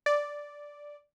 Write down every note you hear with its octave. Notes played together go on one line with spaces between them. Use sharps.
D5